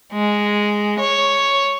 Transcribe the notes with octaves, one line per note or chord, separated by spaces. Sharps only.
G#3
C#5